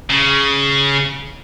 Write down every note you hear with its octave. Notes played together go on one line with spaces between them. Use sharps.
C#3